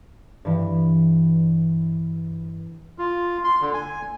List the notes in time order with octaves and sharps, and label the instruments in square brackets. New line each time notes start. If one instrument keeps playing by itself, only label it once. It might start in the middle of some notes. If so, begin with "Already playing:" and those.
[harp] G2 E3
[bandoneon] F4
C6
D3
G#5